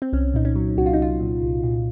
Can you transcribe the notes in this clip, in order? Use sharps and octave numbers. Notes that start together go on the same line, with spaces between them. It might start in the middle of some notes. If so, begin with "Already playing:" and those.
C4
C2 C#4
A#2 D#4
C#4
F#3
C2 F#4
F4
D#4
C2 F4
A#2
C2
A#2